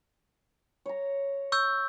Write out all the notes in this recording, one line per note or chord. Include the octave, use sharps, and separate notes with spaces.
C#5 A#5
C#6 E6 G6